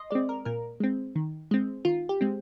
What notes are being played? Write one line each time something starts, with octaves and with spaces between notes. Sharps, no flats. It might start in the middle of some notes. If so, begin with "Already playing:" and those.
Already playing: D#5 C6
G#3 C4 D5
A#4
A#2 A#4
G#3 C4
D#3
G#3 C4
D#3 F4
G4
G#3 C4